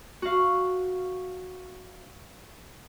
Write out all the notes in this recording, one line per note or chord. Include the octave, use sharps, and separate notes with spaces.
F#4 F5